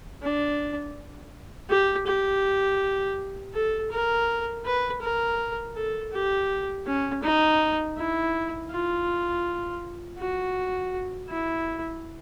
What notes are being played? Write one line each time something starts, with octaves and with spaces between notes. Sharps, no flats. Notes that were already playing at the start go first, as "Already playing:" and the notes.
D4
G4
G4
A4
A#4
B4
A#4
A4
G4
C#4
D#4
E4
F4
F#4
E4